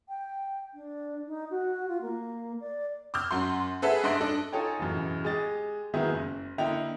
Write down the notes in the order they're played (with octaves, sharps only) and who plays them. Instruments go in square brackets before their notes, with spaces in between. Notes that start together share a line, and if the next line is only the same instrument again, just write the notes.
[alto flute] G5
D4
D#4
F#4
F4
A#3
D5
[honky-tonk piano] D6 E6 F6 G6
F#2 F#5 C6
G#4 A4 B4 E5 F#5
G2 D#5 E5 C6 F#6 D7
D4 A4 D#5
[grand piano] D#4 F4 A4 C#5 G5 G#5
E1 A1 F#2
G#3 G4 D#5 A6
D#3 F#3 G#3 A#3 B3 E4
F#1
D3 A#3 E4 D#5 G5 F7